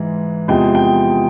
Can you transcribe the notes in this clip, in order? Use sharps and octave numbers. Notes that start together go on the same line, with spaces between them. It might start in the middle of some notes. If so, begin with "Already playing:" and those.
Already playing: G#2 E3 G#3
E2 C3 F3 G#3 G5
G5